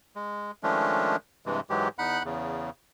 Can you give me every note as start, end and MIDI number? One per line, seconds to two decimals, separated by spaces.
0.16 0.51 56
0.63 1.16 51
0.63 1.16 53
0.63 1.16 56
0.63 1.16 57
0.63 1.16 61
0.63 1.16 62
1.46 1.60 43
1.46 1.60 48
1.46 1.60 52
1.46 1.60 56
1.70 1.89 44
1.70 1.89 52
1.70 1.89 54
1.70 1.89 56
1.70 1.89 67
1.99 2.23 40
1.99 2.23 63
1.99 2.23 78
1.99 2.23 83
1.99 2.23 90
2.25 2.70 40
2.25 2.70 49